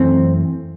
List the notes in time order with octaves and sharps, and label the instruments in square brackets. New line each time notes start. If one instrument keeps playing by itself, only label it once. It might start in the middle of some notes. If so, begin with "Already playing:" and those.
Already playing: [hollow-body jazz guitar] F#2 E3 A3 C4